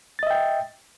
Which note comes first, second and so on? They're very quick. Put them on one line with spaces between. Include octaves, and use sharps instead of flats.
A6 D#5 E5 G5